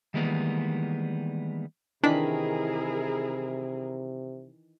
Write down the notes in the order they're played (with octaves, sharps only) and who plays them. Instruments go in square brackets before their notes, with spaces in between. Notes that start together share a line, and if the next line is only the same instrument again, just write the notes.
[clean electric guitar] D#3 E3 G3 G#3 A#3 B3
[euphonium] C3 [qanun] D#3 E3 B5 [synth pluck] D4 [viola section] E4 G#4 A#4